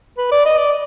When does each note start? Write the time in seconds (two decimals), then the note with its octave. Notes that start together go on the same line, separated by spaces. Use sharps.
0.18 B4
0.32 D5
0.45 D#5
0.58 D5